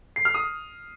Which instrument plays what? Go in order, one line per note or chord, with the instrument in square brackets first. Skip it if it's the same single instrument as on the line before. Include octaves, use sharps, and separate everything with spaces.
[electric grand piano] C7
F6
D#6